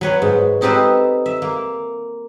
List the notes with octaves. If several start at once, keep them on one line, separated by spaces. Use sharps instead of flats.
F#3 B4 C#5
G#2
C4 D#4 G4 A4 B4 C5
E5
A#3